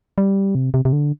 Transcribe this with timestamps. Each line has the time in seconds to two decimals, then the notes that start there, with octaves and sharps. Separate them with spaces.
0.18 G3
0.55 C3
0.74 C3
0.85 C3
0.93 D3